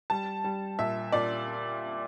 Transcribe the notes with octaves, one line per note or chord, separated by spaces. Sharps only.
G3 A5
G3
A#2 E5
A#2 D5